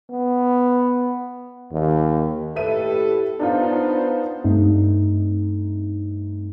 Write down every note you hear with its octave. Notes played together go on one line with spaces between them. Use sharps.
B3
D#2
A2 G4 A4 B4 E5 D#7
B3 D4 D#4 F4 C5
G2 A3 C4 D#4